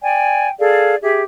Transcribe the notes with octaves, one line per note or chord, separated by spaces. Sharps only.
D5 G5 G#5
G#4 A4 D5 F5
G4 G#4 E5